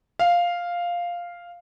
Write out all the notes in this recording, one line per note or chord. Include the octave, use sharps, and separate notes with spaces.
F5